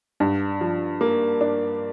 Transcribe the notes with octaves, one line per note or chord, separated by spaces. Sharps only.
G2
F3
A#3
D4